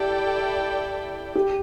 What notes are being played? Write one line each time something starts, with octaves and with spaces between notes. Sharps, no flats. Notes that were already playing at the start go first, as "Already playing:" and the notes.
Already playing: E4 G4 A4 D5 G5
G4